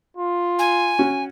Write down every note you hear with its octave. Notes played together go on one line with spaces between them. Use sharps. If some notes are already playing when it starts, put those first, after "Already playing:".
F4
G#5
C#4 F#4